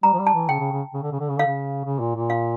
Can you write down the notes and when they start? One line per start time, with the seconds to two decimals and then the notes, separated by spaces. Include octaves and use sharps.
0.03 G3 A#5
0.14 F3
0.19 G3
0.27 A5
0.34 E3
0.49 C#3 G5
0.60 C#3
0.72 C#3
0.94 C#3
1.03 D3
1.12 C#3
1.20 D3
1.29 C#3
1.37 D3 F5
1.46 C#3
1.85 C#3
2.00 A#2
2.15 A#2
2.30 F5